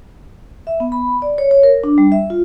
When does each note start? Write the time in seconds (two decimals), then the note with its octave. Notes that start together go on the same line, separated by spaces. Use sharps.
0.67 E5
0.80 B3
0.92 B5
1.22 D5
1.38 C#5
1.51 C#5
1.63 A#4
1.84 D4
1.98 G3
2.12 E5
2.30 F4